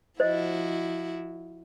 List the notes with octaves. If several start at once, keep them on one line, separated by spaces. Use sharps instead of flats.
F3 E4 F#4 C5 D#5